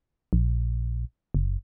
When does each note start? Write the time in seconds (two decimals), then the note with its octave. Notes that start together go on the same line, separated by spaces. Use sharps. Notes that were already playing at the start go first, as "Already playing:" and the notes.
0.33 A#1
1.35 F#1